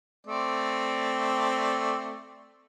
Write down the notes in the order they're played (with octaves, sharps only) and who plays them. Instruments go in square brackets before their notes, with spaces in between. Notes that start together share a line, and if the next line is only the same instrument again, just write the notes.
[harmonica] A3 C4 D5